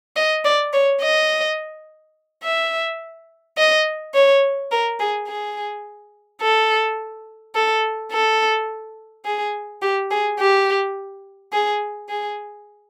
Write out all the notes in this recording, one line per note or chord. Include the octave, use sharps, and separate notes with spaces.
D#5
D5
C#5
D#5
E5
D#5
C#5
A#4
G#4
G#4
A4
A4
A4
G#4
G4
G#4
G4
G#4
G#4